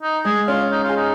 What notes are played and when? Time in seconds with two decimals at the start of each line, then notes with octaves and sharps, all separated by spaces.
0.02 D#4
0.25 G#3 G#4
0.48 C#4 F4
0.72 D#4
0.84 F4
0.89 G#4
0.96 D#4